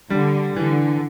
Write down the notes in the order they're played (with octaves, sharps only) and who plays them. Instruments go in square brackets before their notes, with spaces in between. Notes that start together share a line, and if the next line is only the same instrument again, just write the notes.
[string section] D3 [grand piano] G3
[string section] D3 [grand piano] E3